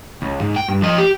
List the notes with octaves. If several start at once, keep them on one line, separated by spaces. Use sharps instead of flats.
C#2
G#2
G5
G2
F3 D#5
G4